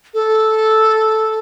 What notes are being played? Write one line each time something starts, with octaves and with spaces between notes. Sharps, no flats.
A4